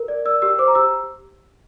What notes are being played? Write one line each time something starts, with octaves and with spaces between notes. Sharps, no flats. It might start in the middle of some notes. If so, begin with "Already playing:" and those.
Already playing: A#4
D5
D5 E6
G4 E6
C5 D6
A#5
G4 E6